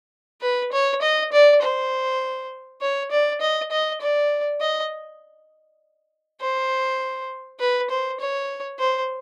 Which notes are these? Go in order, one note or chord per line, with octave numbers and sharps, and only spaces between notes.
B4
C#5
D#5
D5
C5
C#5
D5
D#5
D#5
D5
D#5
C5
B4
C5
C#5
C5